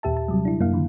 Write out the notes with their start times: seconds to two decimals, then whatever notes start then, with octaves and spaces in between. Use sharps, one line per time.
0.03 D#2 A#2 G4 E5 A5
0.17 A5
0.28 C3 F#3 G3
0.45 D4 E4
0.60 F#2 A#3 E4 F5
0.73 D3 D#3 F3